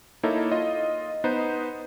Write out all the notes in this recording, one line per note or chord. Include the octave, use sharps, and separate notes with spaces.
A#3 D#4 E4 A4 C#5
F4 D#5
B3 D#4 B4 C5